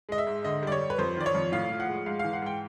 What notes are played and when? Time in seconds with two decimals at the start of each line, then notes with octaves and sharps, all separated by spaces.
0.09 G#3 D#5
0.18 E5
0.27 G#2
0.44 D3 D#5
0.63 G3 D5
0.72 C#5
0.81 G3
0.90 B4
0.98 F2 C5
1.17 D#3 D5
1.26 C#5
1.35 F2
1.52 A2 F5
1.70 F3
1.80 F#5
1.88 G#3
2.06 G#2 F5
2.19 E3 F5
2.33 F#5
2.42 G#2 G5